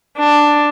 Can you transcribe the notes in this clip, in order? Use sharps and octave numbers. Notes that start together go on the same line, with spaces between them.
D4